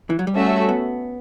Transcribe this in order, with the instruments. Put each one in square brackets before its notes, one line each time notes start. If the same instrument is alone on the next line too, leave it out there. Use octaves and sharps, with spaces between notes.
[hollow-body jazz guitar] E3
F#3
G3
[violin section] A3 C#4 F#4 A4 E5
[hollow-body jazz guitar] B3